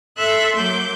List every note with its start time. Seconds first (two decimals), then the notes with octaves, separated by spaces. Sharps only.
0.17 A4 E5 C6 E6 F#6
0.56 F#3 A#3 D6 G6